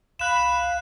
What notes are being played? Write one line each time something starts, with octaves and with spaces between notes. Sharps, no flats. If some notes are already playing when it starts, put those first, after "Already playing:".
C2 F5 B5 F#6 E7